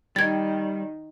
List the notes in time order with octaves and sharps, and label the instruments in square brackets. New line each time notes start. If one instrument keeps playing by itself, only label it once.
[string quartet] D#3 [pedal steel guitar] G3 [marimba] G#6 A6